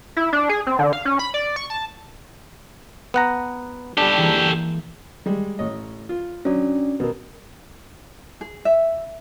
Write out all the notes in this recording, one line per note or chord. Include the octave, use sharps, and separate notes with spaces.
E4
D4
G#4
C4
D3
F5
C#4
B5
D5
C#6
A5
B3 F#5 A#5
G3 D4 G4 A4
E3 G#3 A#3
G3 G#3
A1 C#5 D#5
F4
F#3 C#4 D4 D5
B2 A#4 B4
G#4
E5